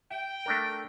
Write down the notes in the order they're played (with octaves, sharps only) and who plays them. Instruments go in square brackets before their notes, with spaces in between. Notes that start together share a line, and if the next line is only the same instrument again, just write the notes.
[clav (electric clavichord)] E5 [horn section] G5
[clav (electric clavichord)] A3 D4 A#4